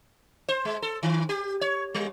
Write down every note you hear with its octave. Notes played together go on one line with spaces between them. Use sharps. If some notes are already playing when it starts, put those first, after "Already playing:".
C5
G#3
A4
D#3
G4
C#5
G3